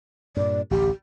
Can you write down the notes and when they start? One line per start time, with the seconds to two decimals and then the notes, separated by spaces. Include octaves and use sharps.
0.37 G2 A#2 D5
0.71 A1 D2 G4